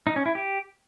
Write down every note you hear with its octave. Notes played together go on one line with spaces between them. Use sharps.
D#4
C#4
E4
G4